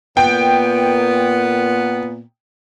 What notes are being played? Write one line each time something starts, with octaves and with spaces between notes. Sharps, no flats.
A#2 B3 G5